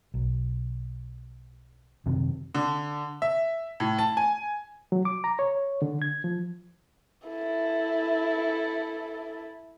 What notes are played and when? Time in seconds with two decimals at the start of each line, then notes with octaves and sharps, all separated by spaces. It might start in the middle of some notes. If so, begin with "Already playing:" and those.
0.14 B1
2.06 F#2 C3 D#3
2.55 D3
3.22 E5
3.80 A2
3.99 A5
4.17 G#5
4.92 F#3
5.05 D6
5.24 A#5
5.39 C#5
5.82 D3
6.02 G#6
6.24 F3
7.28 E4 A4